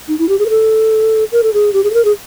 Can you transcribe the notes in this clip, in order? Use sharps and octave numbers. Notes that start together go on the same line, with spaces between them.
D#4
E4
G4
G#4
A#4
A4
A#4
A4
G#4
G4
G#4
A4
A#4
G#4